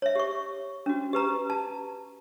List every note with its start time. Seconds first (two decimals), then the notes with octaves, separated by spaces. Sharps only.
0.02 C#5 E5
0.15 G4 C#6
0.86 C#4 F#4
1.13 G4 B4 A#5
1.50 A5